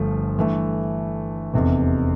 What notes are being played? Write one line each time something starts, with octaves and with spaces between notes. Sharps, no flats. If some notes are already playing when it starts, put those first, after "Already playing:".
Already playing: G1 G2 F3 A3
G2 E3 A3
F1 E2 C3